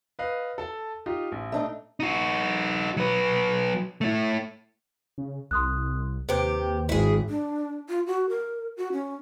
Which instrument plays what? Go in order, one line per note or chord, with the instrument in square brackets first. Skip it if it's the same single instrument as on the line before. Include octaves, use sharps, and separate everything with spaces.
[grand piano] B4 D#5 F5
A4 A5
D#4 F4 G4
A1
[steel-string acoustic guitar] A3 D4 D#4
[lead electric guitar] D#4 F#4
F#3 B4
A3 E4
[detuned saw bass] C#3
[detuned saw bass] C2 [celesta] C6 D#6 F#6
[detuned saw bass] D#2 [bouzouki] C3 G4 [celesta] B4 C5 D7
[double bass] G#1 [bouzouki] E4 G#4
[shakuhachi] D4
F4
F#4
A#4
F#4
C#4